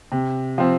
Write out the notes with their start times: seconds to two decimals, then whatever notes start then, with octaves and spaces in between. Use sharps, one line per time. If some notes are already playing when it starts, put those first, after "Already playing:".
0.12 C3
0.58 F3 C4